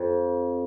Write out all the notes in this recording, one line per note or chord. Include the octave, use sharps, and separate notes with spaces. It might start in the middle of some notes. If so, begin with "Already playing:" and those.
Already playing: F2